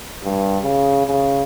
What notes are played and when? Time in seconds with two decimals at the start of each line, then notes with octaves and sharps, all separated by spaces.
0.24 G2
0.63 C#3
1.07 C#3